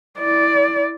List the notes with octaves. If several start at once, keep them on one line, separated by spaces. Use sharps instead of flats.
E4 D5